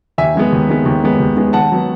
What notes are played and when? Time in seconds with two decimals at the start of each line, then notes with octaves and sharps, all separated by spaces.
0.18 D#2 E5 G#5
0.35 D#3 G#3 B3
0.52 D#2
0.69 D#3 G#3 B3
0.86 D#2
1.03 D#3 G#3 B3
1.19 D#2
1.36 D#3 G#3 B3
1.53 D#2 F#5 A5
1.71 D#3 F#3 B3